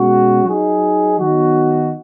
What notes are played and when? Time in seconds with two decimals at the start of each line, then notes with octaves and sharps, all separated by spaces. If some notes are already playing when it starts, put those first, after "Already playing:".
Already playing: B2 G#3 C#4 F#4
0.45 F#3 D#4 G#4
1.18 D#3 F#3 B3 D#4 F#4